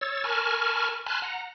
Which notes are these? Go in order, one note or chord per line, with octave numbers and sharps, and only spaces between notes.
C#5 E6 A6
A#4 G#5 A5 B5 C#6 F6
G#5 A5 B5 C6 F6 F#6
F#5 A#5